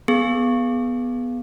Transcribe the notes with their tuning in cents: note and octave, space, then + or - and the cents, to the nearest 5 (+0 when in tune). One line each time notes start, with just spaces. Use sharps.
B3 +0 G#4 +15